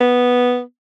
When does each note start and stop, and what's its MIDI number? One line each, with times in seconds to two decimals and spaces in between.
0.01 0.61 59